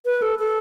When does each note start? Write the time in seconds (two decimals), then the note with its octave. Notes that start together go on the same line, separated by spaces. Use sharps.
0.05 B4
0.22 A4
0.39 A4